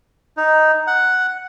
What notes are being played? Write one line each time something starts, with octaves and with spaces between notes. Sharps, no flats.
D#4
F#5